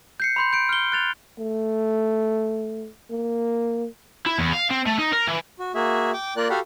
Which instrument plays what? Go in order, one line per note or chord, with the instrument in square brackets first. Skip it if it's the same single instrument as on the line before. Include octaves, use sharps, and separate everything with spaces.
[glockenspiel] G6 C7 C#7
B5 C6 G6
G6 D7
F6 G7
F#6 A6 F7
[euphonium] A3
A#3
[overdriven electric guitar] E4
E2
F5
C4
A3
D#4
A#4
E3
[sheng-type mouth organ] F#4
A#3 F#4 G#4 E5
G5 D6
A#3 F4 A#4 D5 F#6
F#4 G4 A4 F5 F#5 B5